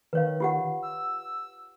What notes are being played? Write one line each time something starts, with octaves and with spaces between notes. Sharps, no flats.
D#3 B4 C#5 F5
F4 G4 F#5
E6